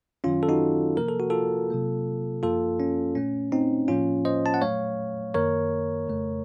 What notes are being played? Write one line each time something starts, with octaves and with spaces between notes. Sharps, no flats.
F#2 D#3 F#3 C#4 F4
A4
D#4 F#4
C3 F3 A#3 A#4
A4
F#4
F4 A4
C3 F#3 A#3
F#2 F3 A#3 F4 A4
C#4
A#2 A3 C#4
C4 D#4
A2 F3 A#3 C#4 F4
C5 D#5
A5
F#5
A#2 F#3 A3 C#5 F5
F#2 D#3 A#3 A#4 C#5
F2 C#3 A3